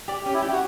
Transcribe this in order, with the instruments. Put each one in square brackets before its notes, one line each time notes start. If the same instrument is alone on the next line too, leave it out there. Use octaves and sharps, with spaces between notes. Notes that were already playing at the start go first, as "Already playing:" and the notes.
[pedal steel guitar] G4 D5
[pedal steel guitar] C#4 [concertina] G4
[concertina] E4
[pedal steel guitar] G4 D5
[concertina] F#4